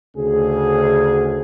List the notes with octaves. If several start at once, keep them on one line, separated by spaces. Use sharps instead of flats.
D2 C#3 G#4